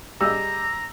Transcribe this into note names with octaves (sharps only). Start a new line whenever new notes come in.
G3 G#4 D#5 A#5 E6